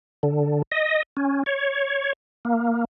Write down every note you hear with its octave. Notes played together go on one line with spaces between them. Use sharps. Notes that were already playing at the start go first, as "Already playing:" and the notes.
D3
D#5
C#4
C#5
A#3